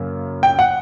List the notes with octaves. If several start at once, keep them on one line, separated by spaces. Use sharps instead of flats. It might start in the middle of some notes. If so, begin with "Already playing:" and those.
Already playing: F#2 C#3 A#3
G5
F#5